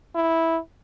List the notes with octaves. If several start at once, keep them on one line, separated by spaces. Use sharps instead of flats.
E4